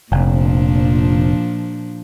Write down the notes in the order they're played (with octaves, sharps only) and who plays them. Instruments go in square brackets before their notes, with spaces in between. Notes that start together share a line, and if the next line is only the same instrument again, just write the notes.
[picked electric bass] F1 [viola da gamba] A#2 F3 D4